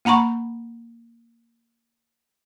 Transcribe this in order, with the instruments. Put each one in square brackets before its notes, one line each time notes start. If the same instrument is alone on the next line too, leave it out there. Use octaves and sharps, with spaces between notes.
[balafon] A#3 F#5 A#5 B5 C#6